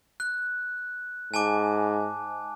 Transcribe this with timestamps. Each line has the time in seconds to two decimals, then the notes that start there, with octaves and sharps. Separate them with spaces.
0.20 F#6
1.34 G#2 G#5 A5 D6